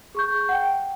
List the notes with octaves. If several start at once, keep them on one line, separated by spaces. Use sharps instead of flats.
G#4 C#6 G6
F#5 G5